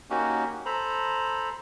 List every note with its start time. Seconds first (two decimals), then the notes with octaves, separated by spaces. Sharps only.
0.10 A#3 C#4 D#4 F#4 G4
0.66 A4 C5 A#5 B5